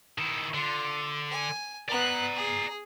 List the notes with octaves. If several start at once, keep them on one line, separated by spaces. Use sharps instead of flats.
D#3 E4
D3 F4
G#5
B3 D5 A#5 F#6
G#4